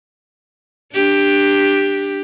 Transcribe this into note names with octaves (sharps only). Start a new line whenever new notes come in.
D4 G4